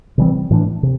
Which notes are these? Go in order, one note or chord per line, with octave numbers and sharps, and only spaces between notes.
C3 E3 G3 C4
A2 E3 A3 D4
C3